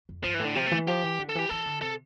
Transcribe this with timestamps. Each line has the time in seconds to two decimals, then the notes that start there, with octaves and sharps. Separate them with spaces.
0.09 F2
0.24 G2 F3
0.34 E3
0.40 A2
0.45 D3
0.55 C3 F3
0.66 A3
0.71 E3
0.87 F3 G4
1.03 E3
1.19 D3
1.29 A4
1.35 E3 G4
1.49 E3 A4
1.66 D3
1.82 C3 A4